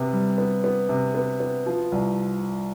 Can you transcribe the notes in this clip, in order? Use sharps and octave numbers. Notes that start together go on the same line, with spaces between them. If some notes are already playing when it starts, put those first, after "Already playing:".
Already playing: C3 B3
G3
B3
B3
C3
B3
B3
F3
C2